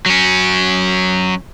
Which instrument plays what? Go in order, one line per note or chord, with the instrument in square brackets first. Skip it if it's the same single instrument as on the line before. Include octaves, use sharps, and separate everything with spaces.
[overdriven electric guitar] F#3 C#4